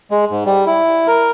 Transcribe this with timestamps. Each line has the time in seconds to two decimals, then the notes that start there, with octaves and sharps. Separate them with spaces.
0.11 G#3
0.30 G#2
0.46 G3
0.67 E4
1.07 A#4